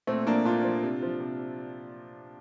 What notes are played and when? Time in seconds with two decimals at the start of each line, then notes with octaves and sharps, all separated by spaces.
0.07 A#2 A3 C4
0.26 F3 A#3 D4
0.45 A#2 D4 F4
0.64 F3
0.83 C3
1.02 F3
1.20 C3